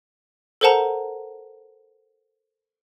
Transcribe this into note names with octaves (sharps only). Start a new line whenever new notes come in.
A4 A#4 C5 F#5 A5 A#5